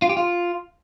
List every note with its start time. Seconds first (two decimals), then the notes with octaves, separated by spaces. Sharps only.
0.02 F4
0.09 G4
0.17 F4